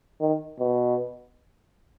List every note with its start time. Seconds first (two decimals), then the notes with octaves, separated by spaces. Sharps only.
0.21 D#3
0.60 B2